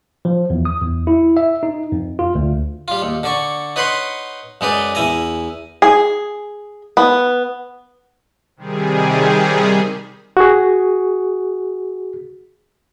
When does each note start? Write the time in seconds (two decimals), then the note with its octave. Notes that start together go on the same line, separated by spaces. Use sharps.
0.25 F3
0.50 E2
0.65 D#6
0.81 E2
1.07 E4
1.37 E5
1.63 D#4
1.92 F2
2.19 F4
2.35 D2
2.88 G3 F4
3.02 D#2
3.23 D3 D5 C#6
3.76 D#4 B4 C#5 F#5 B5 C6
4.61 F#2 G#3 D#4 B4 D5
4.95 E2 E4 G#5 A#5
5.82 G#4
6.97 B3
8.57 C3 D#3 G3 G#4
10.37 F#4 G#4